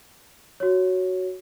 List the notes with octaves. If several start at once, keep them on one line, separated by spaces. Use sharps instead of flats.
F#4 C#5